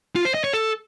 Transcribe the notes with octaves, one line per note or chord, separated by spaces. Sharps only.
F4
C5
D#5
C#5
A4